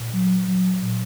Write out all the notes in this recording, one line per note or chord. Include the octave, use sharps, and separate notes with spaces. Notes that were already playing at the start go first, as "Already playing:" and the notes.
Already playing: A#2
F#3
F#3
A#2